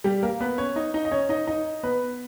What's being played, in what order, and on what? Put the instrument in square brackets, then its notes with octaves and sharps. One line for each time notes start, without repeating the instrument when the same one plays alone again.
[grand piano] G3 G4
A#3 A#4
B3 B4
C#4 C#5
D#4 D#5
D#4 D#5
D#5
C#4 C#5
D#4 D#5
D#4 D#5
B3 B4